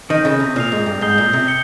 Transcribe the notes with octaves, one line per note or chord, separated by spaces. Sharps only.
D#3 D#6 G6 A#6 D#7
C#3
C3
A#2 F6 C7 F7
G#2
G2
G#2 D#6 G6 C7 G7
A#2
C3
C#7 G7